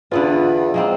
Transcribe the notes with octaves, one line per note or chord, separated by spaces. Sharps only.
E2 D3 B3 F4
G#3 A#3 C4